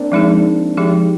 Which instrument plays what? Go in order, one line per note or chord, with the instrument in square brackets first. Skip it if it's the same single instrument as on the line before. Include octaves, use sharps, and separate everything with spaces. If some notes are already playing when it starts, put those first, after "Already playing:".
Already playing: [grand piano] A#3 C4 D4
[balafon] F3 G#3 D#4 G#4
[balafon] F3 G#3 D#4 G#4 [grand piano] G4